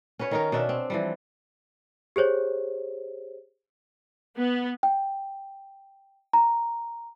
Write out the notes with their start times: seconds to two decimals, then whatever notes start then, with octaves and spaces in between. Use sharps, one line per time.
0.19 C#4 F#4 B4 C#5
0.31 D#3 D#4 A#4
0.52 B2 C#4 D4 E5
0.69 C4
0.90 E3 F3 G3
2.16 G4 G#4 C5 C#5
4.37 B3
4.83 G5
6.33 A#5